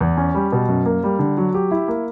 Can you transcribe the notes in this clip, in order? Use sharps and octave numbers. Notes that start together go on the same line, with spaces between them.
E2
C#4
G3
B2
F#2
A#3
G3
D3
F#3
G4
E4
A#3